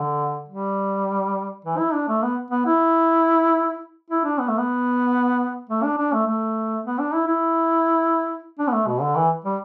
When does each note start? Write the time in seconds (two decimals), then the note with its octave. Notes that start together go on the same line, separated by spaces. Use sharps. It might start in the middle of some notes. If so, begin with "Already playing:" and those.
Already playing: D3
0.48 G3
1.64 E3
1.78 E4
1.93 D4
2.08 A3
2.23 B3
2.50 B3
2.66 E4
4.10 E4
4.24 D4
4.39 B3
4.48 A3
4.58 B3
5.69 A3
5.83 D4
5.97 D4
6.13 A3
6.27 A3
6.85 B3
6.99 D4
7.14 E4
7.27 E4
8.58 D4
8.68 B3
8.73 A3
8.87 B2
9.01 D3
9.16 E3
9.44 G3